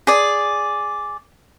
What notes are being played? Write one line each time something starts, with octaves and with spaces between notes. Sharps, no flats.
G#4 D5